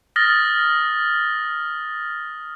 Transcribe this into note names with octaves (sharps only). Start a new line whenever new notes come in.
D#6 F6 A6 A#6 G7